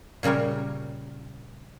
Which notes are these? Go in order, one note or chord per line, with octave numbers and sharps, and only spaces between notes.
A#2 C#3 G3 A#4 C#5